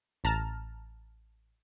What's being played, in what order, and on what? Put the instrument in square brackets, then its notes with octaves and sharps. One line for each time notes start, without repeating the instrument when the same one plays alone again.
[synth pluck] A1 A5 A#5 F6